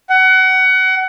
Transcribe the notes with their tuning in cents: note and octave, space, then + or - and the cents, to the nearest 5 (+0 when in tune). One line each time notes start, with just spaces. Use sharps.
F#5 +25